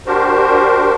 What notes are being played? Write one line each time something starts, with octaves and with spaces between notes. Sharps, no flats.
D4 F#4 G4 A#4 C5